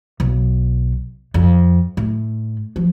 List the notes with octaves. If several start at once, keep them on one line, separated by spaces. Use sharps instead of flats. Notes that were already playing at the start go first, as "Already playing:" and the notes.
B1
F2
A2
F3